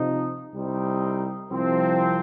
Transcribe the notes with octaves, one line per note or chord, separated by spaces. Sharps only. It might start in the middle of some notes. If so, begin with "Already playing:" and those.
Already playing: C3 F3 C4 D#4
C2 C3 G3 C4 D#4
C2 C3 F3 C4